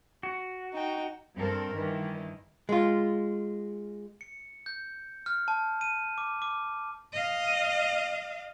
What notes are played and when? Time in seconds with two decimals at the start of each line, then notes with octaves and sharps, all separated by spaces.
0.23 F#4
0.74 D#4 G5
1.36 G2 C4 A4 A#4
1.73 G2 D#3 E3
2.69 G#3 F4
4.21 C#7
4.66 G6
5.26 F6
5.48 A5
5.81 D#7
6.18 D6
6.42 D6
7.13 D#5 F5